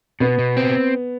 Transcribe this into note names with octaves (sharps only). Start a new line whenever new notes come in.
B2 B3
B2
C4